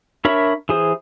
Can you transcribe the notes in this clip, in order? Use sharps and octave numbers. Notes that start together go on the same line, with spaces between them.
D4 A#4 C#5 E5 B5
E3 G#4 C5